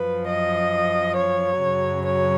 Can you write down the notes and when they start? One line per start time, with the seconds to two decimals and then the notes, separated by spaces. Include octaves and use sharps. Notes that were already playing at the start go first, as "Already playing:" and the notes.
Already playing: F#2 F3 B4
0.27 D#5
1.17 C#5
1.62 F#2 C#3 F#3
2.07 C#5